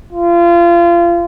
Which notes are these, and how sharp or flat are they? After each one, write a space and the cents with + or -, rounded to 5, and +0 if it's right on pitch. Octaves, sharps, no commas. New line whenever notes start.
F4 -30